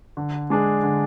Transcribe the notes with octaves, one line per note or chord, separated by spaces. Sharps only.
D3
G#3 D4 G#4
D3